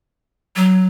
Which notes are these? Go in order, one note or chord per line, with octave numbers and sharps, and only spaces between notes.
F#3